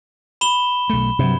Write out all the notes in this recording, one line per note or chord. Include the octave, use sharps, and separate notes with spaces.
B5 E7 G7
B1 A3
G2 C3 F#3